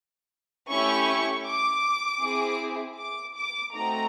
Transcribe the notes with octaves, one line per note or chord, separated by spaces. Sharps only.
A3 C#4 E4 G4 C#6
D6
C4 E4 G#4
D6
D6
A3 C4 D#4 F#4 A#5